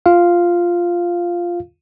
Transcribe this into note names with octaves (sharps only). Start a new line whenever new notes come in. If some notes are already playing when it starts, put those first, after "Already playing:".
F4 F5